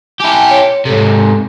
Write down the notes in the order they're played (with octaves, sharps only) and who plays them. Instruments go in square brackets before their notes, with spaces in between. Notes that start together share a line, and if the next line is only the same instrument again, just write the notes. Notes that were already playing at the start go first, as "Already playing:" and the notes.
[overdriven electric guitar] E4 G4 [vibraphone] G#5 A5
[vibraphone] C#5
[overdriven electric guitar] G#2 C3 [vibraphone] A4